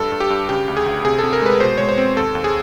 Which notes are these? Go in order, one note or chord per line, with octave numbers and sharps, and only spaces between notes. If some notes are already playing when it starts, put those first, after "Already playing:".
Already playing: G2 A4
G2
G4
G2
C#3 G4
D2
G#4
D2
C3 G#4
C3 A4
A#4
G#3 B4
B2 C5
G#3 C#5
C5
C4
D#2 A4
D#2
G#4